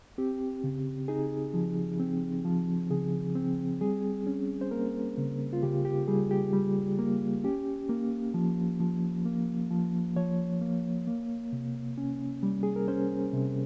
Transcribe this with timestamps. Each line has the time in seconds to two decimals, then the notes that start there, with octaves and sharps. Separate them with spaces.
0.18 C4 G4
0.64 C#3
1.08 D#4 G#4
1.54 F3
1.99 C4
2.45 F3
2.90 C#3 G#4
3.35 C4
3.81 G3 G#4
4.27 C#4
4.61 C5
4.71 A#3 A#4
5.18 C#3
5.53 F4
5.63 C#3 G4
5.85 G4
6.08 G3 G#4
6.31 G4
6.53 G3
6.99 A#3
7.44 C#4 G4
7.89 A#3
8.34 F3
8.80 F3
9.25 A#3
9.71 F3
10.16 F3 C#5
10.62 A#3
11.07 A#3
11.53 C3
11.98 C#4
12.43 G3
12.63 G#4
12.76 A#4
12.88 C#4 C5
13.33 C3